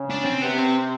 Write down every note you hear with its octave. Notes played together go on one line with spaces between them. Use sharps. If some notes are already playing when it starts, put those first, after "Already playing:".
Already playing: C#3
D4
C4
C3 B3
C4